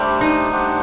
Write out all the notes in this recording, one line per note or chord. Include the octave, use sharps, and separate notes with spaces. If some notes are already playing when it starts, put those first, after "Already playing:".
Already playing: G3 A3 D4 G4 C5
D#4
D4 G4 C5 F#5